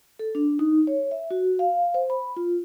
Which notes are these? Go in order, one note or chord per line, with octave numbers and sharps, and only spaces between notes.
A4
D4
D#4
C#5
E5
F#4
F5
C5
B5
F4